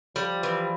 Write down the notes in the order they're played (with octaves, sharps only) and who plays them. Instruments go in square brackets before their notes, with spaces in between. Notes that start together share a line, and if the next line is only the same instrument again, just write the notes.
[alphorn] F3 [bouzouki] G3
[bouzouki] E3